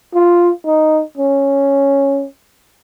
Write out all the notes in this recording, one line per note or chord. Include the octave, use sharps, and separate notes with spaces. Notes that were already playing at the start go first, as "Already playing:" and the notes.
F4
D#4
C#4